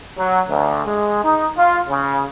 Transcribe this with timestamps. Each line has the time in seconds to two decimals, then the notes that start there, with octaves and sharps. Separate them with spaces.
0.18 F#3
0.49 D2
0.86 G#3
1.24 D#4
1.58 F4
1.89 C#3